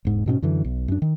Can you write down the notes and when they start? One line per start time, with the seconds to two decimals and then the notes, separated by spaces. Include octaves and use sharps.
0.05 E1 G#2
0.26 G#2 B2 B3 C#4
0.42 F#2 D3 E3
0.64 B1
0.88 F#2 D4
1.02 D#3